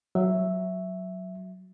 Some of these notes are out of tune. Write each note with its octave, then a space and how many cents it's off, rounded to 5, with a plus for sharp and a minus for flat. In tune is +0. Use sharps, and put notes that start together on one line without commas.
F#3 +0 E5 +0